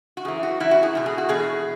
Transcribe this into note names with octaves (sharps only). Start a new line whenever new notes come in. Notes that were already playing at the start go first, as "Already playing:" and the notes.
F#4
F#2 E3 G#4
F#4
F#2 E3 E4
F#4
G#4
E2 B2
G#4
F#4
E2 B2 G#4